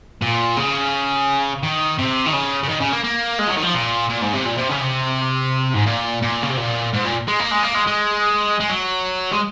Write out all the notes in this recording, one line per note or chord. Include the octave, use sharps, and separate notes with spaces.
A#2
C#3
D#3
C3
D#3
C#3
C#3
D#3
C#3
A#3
A#3
G#3
F3
F#3
D#3
F3
A#2
A#2
G#2
C3
A#2
C3
C#3
C3
G#2
A#2
A#2
C#3
C3
A#2
G#2
A#2
G#3
A#3
G#3
A#3
G#3
G#3
G#3
F#3
G#3